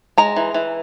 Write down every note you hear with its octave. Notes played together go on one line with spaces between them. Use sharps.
G#3 A#5
E3
E3